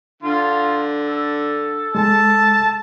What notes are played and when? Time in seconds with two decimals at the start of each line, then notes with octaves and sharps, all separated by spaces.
0.23 D3 F4
1.07 A4
1.95 G#3 A5